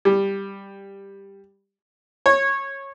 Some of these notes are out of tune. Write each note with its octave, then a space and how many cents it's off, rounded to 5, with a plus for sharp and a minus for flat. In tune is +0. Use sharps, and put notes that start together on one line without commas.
G3 +5
C#5 -15